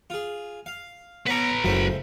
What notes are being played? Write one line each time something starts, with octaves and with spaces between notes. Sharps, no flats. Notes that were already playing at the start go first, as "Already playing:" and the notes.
F4 G#4
F5
B3 B4 C#5 A#5 D6
F#1 C#2 F#2 F#3 A3 C5